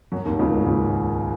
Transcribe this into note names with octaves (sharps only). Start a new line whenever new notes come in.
F#2 F#3
D#2 D#3
C#2 C#3
G#2
C#2 C#3